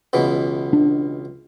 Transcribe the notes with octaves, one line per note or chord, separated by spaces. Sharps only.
C#2 B2 E3
D4